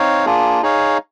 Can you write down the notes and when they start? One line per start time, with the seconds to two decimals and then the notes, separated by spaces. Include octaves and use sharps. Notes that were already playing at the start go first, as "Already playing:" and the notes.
Already playing: C4 D#4 C#5 F5
0.26 A#3 D4 F4 G#4
0.62 D#4 G#4 C#5 F5